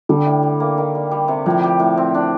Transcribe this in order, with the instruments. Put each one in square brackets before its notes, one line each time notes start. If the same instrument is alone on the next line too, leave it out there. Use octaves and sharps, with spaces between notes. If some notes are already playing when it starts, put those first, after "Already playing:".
[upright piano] D3 [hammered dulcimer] G3
[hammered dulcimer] A2
G3
A#3
D#3
G3
G3
C3
[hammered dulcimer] A2 [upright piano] F3
[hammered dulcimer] G4
A2
C4
D4